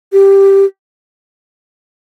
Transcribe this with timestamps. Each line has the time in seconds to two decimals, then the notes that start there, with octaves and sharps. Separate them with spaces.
0.13 G4